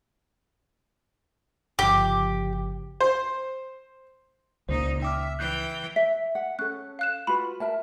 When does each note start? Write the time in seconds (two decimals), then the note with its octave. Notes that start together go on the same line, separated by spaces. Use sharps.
1.79 G1 C#3 F3 G4
3.00 C5
4.69 C#2 A#2 C#3 D#4 C5
5.02 E5 G5 D6 F6
5.39 E3 G5 F#6 G6 C7
5.96 E5 B6
6.35 F#5
6.59 C#4 A4 F#6
6.99 F5 F#6 E7
7.27 F4 F#4 B4 B5
7.60 A#4 E5 A5